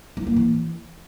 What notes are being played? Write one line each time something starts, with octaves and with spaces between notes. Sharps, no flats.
E4
A#3
E3